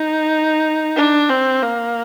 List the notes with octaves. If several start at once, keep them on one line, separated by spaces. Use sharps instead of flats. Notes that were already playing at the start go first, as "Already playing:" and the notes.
Already playing: D#4
D4
C4
A#3